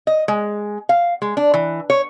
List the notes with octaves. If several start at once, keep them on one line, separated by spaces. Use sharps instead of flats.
D#5
G#3
F5
G#3
D4
E3
C#5